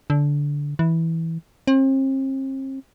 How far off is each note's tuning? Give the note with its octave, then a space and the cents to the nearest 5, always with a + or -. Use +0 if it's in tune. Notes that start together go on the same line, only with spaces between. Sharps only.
D3 -15
E3 -10
C4 +40